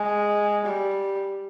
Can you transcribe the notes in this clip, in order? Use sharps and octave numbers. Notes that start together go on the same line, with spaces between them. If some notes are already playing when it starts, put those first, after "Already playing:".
Already playing: G#3
G3